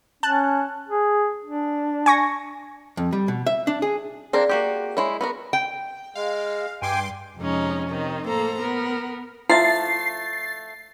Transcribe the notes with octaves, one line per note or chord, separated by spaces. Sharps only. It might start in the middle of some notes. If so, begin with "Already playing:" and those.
C#4 A5 F#6
G#4
D4
G#5 C#6 A#6
F2
G3
B2
E5
D4
G#4
C4 D4 G#4 A#4 D5 F5
A#3 F#4 G4 D6
G#3 E4 C#5
B3 F#4 A#4
G5
G#3 F5
G2 G5 G#5 C6 D6
F2 C3 G#3 C#4 D#4
C3 D#3 D#4
A2 A#3 A4 C5 A#5
B3 A#4
F3 A3 E4 E5 A6 C7